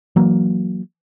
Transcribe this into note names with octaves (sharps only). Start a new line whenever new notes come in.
E3 F#3 A#3